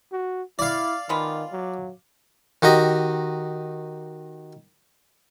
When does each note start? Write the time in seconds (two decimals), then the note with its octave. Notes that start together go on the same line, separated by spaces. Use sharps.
0.12 F#4
0.59 E4 D5 F5
1.09 D#3 G#3 B3 F4
1.52 F#3
2.62 D#3 F#4 G4 D#5